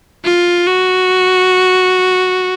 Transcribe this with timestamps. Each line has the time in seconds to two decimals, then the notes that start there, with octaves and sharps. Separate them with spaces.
0.25 F4
0.68 F#4